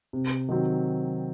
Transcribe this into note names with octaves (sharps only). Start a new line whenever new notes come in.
C3
D#3 F#3 C4